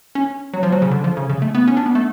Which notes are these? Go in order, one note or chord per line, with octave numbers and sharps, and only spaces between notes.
C#4
F#3
F3
F#3
C#3
D3
F3
C#3
C#3
A3
B3
C#4
D4
B3
A3